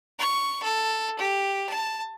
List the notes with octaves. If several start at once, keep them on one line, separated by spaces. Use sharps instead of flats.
C#6
A4
G4
A5